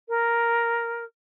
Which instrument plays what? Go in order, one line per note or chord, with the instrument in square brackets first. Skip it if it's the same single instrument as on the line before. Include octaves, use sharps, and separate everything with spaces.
[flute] A#4